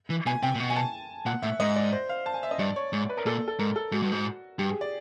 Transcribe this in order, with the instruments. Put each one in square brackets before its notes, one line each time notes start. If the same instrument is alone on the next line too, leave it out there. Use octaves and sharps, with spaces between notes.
[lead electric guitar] E3
[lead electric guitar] B2 [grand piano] G#5
[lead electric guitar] C3 [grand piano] G5
[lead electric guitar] A#2
B2
[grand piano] G#5
A5
[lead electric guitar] A#2 [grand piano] F#5
[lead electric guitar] A2 [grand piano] E5
[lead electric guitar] G#2 [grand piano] D#5
[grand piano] D5
C5
F5
A5
G#5
E5
D#5
[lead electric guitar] G2 [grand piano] D5
[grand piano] C#5
[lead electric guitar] G#2 [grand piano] C#5
[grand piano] B4
A#4
[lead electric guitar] A#2 [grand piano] A4
[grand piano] A4
[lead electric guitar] G#2 [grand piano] A#4
[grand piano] A4
[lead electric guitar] G#2 [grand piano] F#4
[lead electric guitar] G2
G#2
[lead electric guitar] G2 [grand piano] G4
[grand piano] G#4
D5